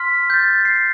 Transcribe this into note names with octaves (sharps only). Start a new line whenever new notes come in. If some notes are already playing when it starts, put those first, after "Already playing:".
Already playing: C6 F6 B6
G6
A6
C7